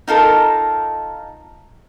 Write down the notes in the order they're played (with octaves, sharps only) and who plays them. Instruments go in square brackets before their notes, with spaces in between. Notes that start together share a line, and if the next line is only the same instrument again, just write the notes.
[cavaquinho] D#4 F4 A4 A#4